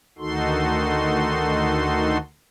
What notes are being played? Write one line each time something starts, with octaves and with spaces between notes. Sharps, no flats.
D2 D#3 D#4 F#4 A4 C6